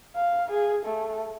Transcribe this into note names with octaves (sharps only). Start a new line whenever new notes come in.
F5
G#4
A3